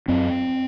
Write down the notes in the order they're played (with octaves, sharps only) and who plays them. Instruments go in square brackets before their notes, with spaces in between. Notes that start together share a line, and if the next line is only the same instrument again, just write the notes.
[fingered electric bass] F#2 C4